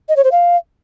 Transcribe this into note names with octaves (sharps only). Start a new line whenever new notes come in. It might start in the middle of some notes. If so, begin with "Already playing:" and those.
D#5
C#5
C5
F5